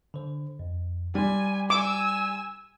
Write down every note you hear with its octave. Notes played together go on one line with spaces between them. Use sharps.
D3 C5
F2
G3 G5 G#5 C6
G#5 D6 E6